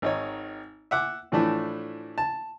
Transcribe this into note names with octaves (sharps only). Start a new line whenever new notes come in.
G#1 D#4 C#5
E5 F#5 D6
A2 E3 F3 A3 D4 E4
A5